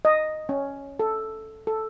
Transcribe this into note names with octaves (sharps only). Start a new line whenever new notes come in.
D#5
C#4
A4
A4